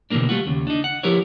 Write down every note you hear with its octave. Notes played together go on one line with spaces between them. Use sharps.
B2 D3 E3 F#3 A#3 D4
G3 A3 F4 F#4
D#2 C#3
D4 D#4
F#5
F3 E4 G4 A#4 B4 C#5